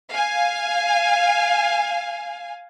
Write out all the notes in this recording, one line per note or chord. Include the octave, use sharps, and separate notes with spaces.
F5 G#5